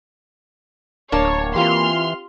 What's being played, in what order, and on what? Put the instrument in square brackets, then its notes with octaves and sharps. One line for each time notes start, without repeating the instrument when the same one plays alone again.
[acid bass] D1 [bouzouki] A#3 A5 [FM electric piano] D4 [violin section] C#5
[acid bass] E3 [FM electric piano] C4 F4 G4 [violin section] C6 F6